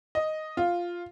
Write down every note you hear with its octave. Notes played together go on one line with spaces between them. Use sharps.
D#5
F4